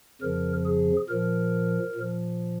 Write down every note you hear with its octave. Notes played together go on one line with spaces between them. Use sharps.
F2 C#3 F3 A#4
G#4
A#2 F3 A#4
A#2 F3